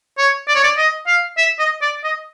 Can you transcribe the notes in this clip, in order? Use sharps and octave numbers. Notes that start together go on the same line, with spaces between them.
C#5
D5
C#5
D5
D#5
F5
E5
D#5
D5
D#5